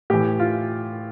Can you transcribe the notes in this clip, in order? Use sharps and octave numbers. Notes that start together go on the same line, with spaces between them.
A2 E3 G4
F4